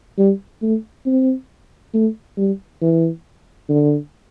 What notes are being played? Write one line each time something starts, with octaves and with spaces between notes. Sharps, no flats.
G3
A3
C4
A3
G3
E3
D3